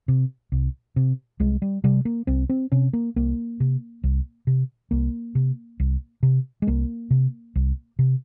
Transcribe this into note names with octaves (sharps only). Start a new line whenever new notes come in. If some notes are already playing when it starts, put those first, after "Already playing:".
C3
C2
C3
C2 G#3
G3
C3 G3
A#3
C2 C4
C4
C3 C#4
A#3
C2 A#3
C3
C2
C3
C2 A#3
C3
C2
C3
G#3
C2 A#3
C3
C2
C3